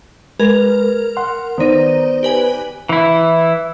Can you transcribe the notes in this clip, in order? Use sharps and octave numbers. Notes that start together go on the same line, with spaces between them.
G#3 A#4 B4 G#6
F#5 C6
D#3 B3 D#4 C5 D5
G4 B4 G#5
E3 E4